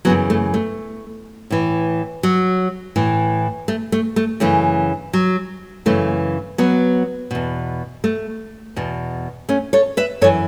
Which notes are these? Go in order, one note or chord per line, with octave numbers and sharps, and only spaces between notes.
F#2 C#3 E3 F#3 B3
A3
A3
A2 E3
F#3
A2 E3
A3
A3
A3
F#2 C#3 E3 A3
F#3
F#2 C#3 E3 A3
F#3 B3
E2 B2
A3
E2 B2
A3 C#4
A4 C#5
B4 E5
F#2 E3 A4 C#5